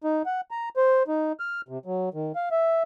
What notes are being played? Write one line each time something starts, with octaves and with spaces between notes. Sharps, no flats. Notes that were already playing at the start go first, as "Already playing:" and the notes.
D#4
F#5
A#5
C5
D#4
F6
C3
F#3
D#3
F5
E5